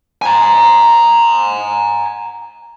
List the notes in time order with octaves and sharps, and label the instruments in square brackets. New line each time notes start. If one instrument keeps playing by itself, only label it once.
[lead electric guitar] G#5 A#5